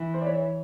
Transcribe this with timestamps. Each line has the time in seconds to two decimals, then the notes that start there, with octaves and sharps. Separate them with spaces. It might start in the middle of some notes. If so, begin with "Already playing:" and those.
Already playing: E3
0.14 C5
0.21 D5
0.26 C#5